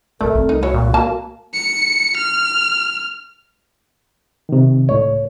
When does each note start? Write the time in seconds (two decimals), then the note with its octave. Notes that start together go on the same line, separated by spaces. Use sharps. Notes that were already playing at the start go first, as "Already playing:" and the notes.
0.21 D1 D#2 A3 A#4 D5
0.35 C4
0.49 C2 D#4
0.63 G#3 E4 F#4 C#5
0.74 A#2
0.94 A#3 A5
1.54 C#7
2.17 F6
4.49 C3 D#3
4.89 C#2 A2 C#5